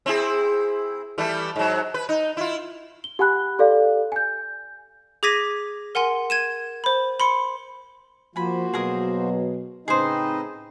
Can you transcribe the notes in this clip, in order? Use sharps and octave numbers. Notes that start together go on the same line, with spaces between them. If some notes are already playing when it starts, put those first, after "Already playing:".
C4 E4 G#4
E3 G3 A3
G#2 F#3
B4
D#4
E4 F4
G7
G4 F#5 G#5 B5 F#6
G4 A4 D5 F5
G#5 G6
G#4 D6 G#6 A#6 B6 D#7
A#4 F#5 G#5 C6
G#6 D#7 E7
C5 B5
B5 C6 C#7
F3 A#3 F#4 C5 G#5 B5
B2 F#3 G#4 A#4 D#6
A2 C#3 C4 D#4 G#4 B4 C5 D#5